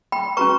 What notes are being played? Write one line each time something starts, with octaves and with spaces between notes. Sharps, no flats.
G5 B5
C#4 F#4 B4 A#5 C#6